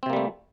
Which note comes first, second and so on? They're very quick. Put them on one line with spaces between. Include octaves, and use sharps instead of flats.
C4 C3 A#3 G3 A3